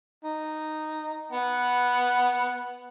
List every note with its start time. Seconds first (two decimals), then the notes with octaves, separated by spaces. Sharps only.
0.24 D#4
1.32 B3 F#5